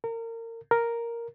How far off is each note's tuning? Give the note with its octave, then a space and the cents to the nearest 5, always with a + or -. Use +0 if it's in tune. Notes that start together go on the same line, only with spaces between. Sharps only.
A#4 -30
A#4 +0